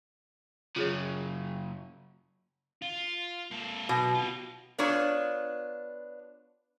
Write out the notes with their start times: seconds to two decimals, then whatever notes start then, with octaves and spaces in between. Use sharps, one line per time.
0.76 F#2 C#3 F4 G#4 C#5
2.82 F4
3.51 A#3 A4
3.89 B1 B2
4.14 F4 G4
4.78 B3 D4 F4 C#5